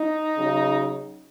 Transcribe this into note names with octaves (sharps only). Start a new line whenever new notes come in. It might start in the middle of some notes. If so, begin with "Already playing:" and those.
Already playing: D#4
C#3 F#3